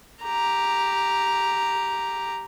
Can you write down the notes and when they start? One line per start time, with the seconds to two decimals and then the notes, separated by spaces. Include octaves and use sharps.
0.24 G4 A#5